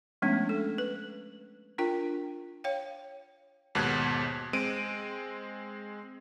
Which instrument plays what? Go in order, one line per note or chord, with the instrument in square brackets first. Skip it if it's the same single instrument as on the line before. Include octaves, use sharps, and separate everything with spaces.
[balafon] F3 G#3 A3 B3 C#4 D4
A4
B4
D4 F4 A#4 G5
C#5 F5 G5
[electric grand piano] D#2 G#2 B2 F#6 G#6
G#3 C4 D7 D#7